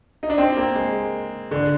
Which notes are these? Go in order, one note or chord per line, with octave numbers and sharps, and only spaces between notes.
D#4
D4
C4
A#3
G#3
D3